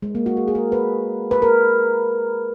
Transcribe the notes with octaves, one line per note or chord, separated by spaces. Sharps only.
G#3
A#3
F#4
G#4
G#4
A#4
B4
B4
A#4